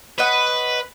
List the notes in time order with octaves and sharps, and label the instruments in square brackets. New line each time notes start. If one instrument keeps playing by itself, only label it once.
[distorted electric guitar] B4 [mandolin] C#5 D#5 F#5